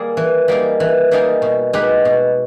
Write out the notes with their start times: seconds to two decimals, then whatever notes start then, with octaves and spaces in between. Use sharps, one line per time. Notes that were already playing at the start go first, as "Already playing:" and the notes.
Already playing: G3 A#3 G#4
0.17 E3
0.48 G3 A#3 D#4 G#4
0.80 E3
1.11 G3 A#3 D#4 G#4
1.42 B2
1.73 G#3 D#4 G4 B4
2.05 B2